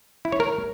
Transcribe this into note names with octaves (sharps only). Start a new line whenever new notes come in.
E4
C#5
A#4